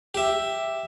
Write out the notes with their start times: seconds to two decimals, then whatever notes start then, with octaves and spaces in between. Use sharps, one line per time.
0.14 G4 E5